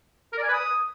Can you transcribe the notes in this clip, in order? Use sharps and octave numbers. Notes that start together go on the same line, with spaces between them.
A#4
D5
G#5
B4
D#6